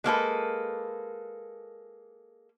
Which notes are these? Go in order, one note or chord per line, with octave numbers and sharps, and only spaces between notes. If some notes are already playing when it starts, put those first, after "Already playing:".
G#3 A#3 A4 B4